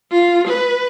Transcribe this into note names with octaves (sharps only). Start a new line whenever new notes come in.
F4
B4